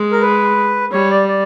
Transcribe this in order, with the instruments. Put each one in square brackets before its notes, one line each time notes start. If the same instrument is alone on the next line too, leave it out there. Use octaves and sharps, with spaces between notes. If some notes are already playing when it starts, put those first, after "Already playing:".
Already playing: [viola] G#3
[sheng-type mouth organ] A#4
B4
[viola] G3 [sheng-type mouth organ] C#5
[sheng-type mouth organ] D5
D5